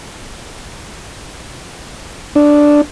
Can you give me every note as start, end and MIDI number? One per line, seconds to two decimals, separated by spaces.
2.35 2.81 62